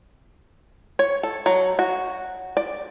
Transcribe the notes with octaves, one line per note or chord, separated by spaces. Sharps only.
C#5
A4
F#3
F#4
D5